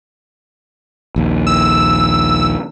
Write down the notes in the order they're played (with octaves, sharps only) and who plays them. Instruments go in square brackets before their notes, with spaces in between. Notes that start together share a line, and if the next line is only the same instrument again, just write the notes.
[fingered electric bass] A#1 D#2
[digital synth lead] E6